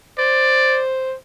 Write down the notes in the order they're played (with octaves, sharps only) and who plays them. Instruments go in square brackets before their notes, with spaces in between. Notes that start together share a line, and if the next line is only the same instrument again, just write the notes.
[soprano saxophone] C5 [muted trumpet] D5